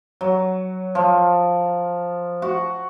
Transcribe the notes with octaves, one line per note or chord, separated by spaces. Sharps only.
F#3
F3
F#4